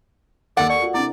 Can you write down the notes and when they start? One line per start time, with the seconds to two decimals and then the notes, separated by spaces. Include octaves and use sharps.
0.57 D#2 D#3 A4 A#4 D5 F#5
0.70 D5 C#6
0.82 F4 F#4
0.94 C3 D4 E4 D5